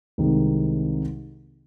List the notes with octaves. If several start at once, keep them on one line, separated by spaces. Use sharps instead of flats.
C2 C3 D#3 G#3 D#4